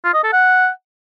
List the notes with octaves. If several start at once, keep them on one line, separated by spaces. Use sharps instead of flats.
F4
D#5
A4
F#5